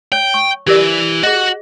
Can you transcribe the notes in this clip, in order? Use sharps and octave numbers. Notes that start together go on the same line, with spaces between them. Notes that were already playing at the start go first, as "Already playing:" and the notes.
C#5 G5
C#6
E3 G4 A#4 D5
F#4 G#4 D#5